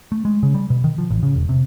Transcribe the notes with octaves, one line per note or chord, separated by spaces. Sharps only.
A3
G#3
C#3
G3
B2
D#3
F3
A1
C#3
E1
C3